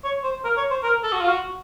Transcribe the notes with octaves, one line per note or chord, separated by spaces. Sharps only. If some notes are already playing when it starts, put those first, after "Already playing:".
C#5
C5
A#4
C#5
C5
A#4
A4
F#4
F4
F#4